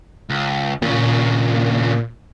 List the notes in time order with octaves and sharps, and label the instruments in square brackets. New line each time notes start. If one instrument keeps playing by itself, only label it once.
[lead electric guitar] C#2
[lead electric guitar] D#2 C#3 [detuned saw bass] A#2